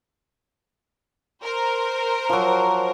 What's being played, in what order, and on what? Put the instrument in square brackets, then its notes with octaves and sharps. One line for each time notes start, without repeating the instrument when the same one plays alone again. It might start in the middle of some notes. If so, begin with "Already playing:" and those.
[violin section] A#4 C5
[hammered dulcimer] F3 F#3